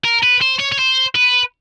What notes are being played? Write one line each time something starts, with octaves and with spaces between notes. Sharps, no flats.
A#4
B4
C5
C#5
C#5
C5
B4